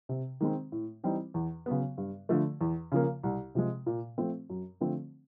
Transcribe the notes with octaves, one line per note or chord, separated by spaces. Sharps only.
C3
D#3 G#3 C4
A2
E3 G3 C4 D#4
E2
C#3 F#3 B3
G2
D3 F3 A3
E2
C#3 F3 A#3
C2
C3 F3 G#3
A#2
F3 A3 C4
F#2
D3 F3 A3 C4